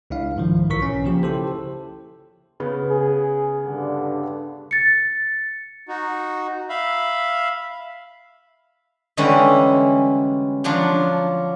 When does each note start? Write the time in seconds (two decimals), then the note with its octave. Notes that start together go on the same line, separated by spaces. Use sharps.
0.10 C#2 D4 E4 F5
0.36 G#2 D#3 F3
0.70 B1 E3 A#4 C#6 B6
0.82 C#4
1.04 C#3 F3 A#3 G4
1.23 E4 G4 A4 C5
2.60 C#3 B3
2.89 G#4
3.65 G2 D3
4.71 A6 C#7
5.88 D#4 F#4
6.69 E5 F5 B5
9.17 D3 E3 G3 G#3 C#4 E4
10.64 F3 F#3 D4 F4